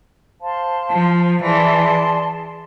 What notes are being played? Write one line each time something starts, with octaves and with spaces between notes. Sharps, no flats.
C5 F5 A5 C6
F3
E3 G#4 D5 A5 C6